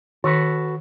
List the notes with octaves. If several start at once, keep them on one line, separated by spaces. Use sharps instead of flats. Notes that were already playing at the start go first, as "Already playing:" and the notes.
D#3 F#4 A4 B4